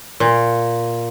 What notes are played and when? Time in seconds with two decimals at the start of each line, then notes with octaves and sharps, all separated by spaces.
0.20 A#2